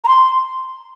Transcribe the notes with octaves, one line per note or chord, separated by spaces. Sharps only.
A#5
C6